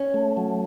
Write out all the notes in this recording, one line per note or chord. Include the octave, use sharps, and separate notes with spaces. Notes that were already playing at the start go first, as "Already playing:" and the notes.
Already playing: C#4
A3
F#3